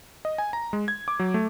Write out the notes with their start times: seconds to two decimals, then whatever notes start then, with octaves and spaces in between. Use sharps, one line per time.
0.25 D#5
0.38 G#5
0.53 A#5
0.73 G#3
0.88 G#6
1.08 D6
1.19 F#3
1.34 A3